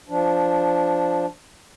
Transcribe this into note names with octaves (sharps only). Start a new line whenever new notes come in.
F3 D4